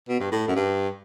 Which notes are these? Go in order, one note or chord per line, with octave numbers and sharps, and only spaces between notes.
B2
G2
A2
F#2
G2